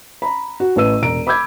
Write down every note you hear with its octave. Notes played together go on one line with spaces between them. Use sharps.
A#5 B5
F#4
A1 A3 B4 E6 D#7
E1 A#5 D7
B5 D6 E6 G6 G#6